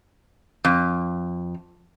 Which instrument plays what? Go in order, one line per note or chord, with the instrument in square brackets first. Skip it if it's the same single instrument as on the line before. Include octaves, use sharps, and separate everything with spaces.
[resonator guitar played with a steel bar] F2